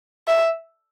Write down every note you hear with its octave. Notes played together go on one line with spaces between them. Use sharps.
E5